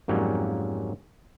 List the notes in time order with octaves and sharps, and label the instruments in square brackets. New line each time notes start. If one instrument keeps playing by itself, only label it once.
[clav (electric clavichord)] F2 G#2 F#3 G3 A#3 C#4